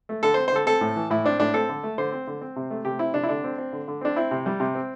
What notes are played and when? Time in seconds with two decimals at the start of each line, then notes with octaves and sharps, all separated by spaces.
0.09 A3
0.23 D3 A4
0.34 C4 C5
0.48 C5
0.52 D3 A4
0.66 C4 A4
0.81 A2
0.96 E3
1.10 A2 E4
1.24 C4 D4
1.40 A2 D4
1.54 C4 A4
1.69 D3
1.83 A3
1.98 D3 C5
2.12 C4
2.27 D3
2.41 C4
2.56 C3
2.71 A3
2.85 C3 G4
2.99 C4 E4
3.14 C3 D4
3.23 E4
3.29 D3 D4
3.44 C4
3.58 C4
3.73 D3
3.88 D3
4.01 C4 D4
4.16 C4 E4
4.31 C3
4.46 G3
4.60 C3
4.74 C4